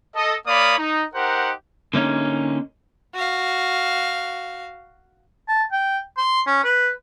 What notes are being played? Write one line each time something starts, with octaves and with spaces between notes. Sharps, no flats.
A4 D#5
A#3 C#5 D5 F5 B5 D#6
D#4
D#4 G4 A#4 C5 F#5
D3 A#3 C#4 D#4
F#4 F5
A5
G5
C6
C#4
B4